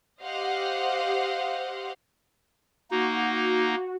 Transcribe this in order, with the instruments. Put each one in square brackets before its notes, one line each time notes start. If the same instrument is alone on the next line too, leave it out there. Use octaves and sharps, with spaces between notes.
[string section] G4 C5 D#5 F5 F#5
[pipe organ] A#3 D#4 [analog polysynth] F#4